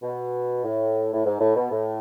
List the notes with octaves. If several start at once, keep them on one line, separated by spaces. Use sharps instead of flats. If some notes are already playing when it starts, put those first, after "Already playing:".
B2
A2
A2
G#2
A2
B2
A2